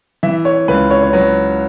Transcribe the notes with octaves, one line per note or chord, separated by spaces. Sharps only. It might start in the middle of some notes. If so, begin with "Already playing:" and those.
E3 E5
C#5
C#2 B4
C#5
C#5
F#3 B4